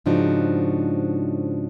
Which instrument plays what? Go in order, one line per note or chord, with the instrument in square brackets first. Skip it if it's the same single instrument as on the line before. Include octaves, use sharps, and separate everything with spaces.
[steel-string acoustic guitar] G#2 C#3 F3 D4 D#4 F#4